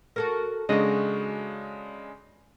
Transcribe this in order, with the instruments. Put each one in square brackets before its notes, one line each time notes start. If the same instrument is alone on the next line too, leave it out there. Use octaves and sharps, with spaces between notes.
[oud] F#4 A4 A#4
[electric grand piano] C#3 G#3 D4 [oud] F#4 D#5